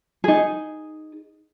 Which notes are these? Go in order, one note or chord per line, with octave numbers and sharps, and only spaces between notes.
D#4 G#4